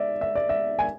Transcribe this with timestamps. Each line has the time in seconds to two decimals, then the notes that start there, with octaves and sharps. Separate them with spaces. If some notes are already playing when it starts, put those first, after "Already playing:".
Already playing: D5 E5
0.21 E5
0.35 D5
0.49 E5
0.79 G#5